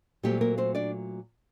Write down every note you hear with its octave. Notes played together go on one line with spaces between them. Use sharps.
A#2 F#3 G3 A3 C4 G4
A#3 A#4
C4 C5
D4 D5